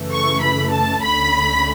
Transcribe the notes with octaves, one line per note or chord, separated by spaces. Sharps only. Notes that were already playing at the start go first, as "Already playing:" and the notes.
Already playing: F#2 C#3 E3 A3
C#6
B5
A5
D2 D3 A3 C#4 B5